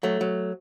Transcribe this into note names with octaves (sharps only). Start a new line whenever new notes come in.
F#3 A3
F#3